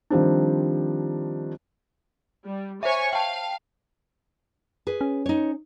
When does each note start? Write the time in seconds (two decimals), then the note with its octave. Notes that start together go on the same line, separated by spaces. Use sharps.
0.10 D#3 F3 G3 C4 D4
2.46 G3
2.83 C5 C#5 E5 G#5 C#6
3.13 F5 G5 A5
4.87 G#4 B4
5.01 C#4
5.26 D#4 C#5